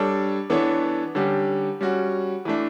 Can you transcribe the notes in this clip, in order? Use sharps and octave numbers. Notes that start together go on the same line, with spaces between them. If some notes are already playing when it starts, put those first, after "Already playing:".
Already playing: G3 D4 A4 C#5
E3 B3 D4 A4 C#5
D3 G3 C#4 G4
G3 C#4 F#4
E3 A3 D4